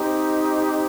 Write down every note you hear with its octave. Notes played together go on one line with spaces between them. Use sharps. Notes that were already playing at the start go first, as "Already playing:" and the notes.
Already playing: C4 D#4 G4